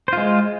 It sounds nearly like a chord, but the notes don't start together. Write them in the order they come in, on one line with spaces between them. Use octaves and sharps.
C5 F4 G#3